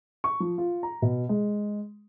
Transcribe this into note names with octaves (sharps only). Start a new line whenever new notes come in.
C#6
F3
F4
A#5
B2
G#3